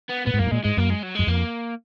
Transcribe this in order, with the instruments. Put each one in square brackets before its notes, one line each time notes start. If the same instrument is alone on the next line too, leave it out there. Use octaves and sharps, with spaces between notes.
[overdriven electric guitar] B3
[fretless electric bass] A#2 [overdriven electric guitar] B3
[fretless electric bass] G#2
[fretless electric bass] F#2 [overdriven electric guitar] A#3
[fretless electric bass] G#2
[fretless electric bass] A#2 [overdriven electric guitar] G#3
[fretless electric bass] G#2 [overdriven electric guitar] G#3
[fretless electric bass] F#2 [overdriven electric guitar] A#3
[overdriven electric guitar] G#3
F#3
[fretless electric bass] F#2 [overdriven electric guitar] G#3
[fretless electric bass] F2 [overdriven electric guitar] A#3